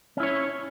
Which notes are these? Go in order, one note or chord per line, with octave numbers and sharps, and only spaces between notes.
C#4 E4 C#5